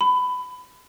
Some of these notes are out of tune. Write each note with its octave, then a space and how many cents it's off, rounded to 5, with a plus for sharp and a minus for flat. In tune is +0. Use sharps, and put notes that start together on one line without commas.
B5 +20